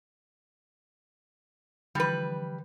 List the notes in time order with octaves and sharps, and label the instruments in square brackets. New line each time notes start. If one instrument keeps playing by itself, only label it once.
[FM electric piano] D3 E3 F3 [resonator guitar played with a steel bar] G3 B4